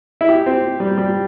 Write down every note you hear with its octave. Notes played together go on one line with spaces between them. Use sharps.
E4
G4
C4
G3
G3